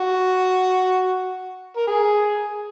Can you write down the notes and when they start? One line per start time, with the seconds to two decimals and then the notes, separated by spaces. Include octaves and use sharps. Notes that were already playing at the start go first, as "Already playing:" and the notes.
Already playing: F#4
1.77 A#4
1.87 G#4